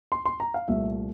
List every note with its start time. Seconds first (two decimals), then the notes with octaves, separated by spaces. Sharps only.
0.12 C6
0.25 C6
0.40 A#5
0.54 F5
0.68 C2 A#2 A3 E5